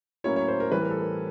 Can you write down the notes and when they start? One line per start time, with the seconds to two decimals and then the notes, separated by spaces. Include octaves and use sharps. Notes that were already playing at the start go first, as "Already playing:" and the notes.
0.24 A2 F#3 A#3 C#4 E4 C#5
0.36 C#5
0.48 C5
0.60 A#4
0.72 A2 E3 G3 C4 B4
0.81 A#4
0.90 A4
0.99 A#4